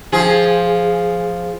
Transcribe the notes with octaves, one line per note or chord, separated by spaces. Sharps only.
F3 G#4